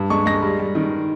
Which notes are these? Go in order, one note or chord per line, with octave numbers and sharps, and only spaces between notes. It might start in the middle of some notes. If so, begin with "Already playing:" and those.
Already playing: G2
G#3 C#6
G#3 A#6
G3
G3
D#3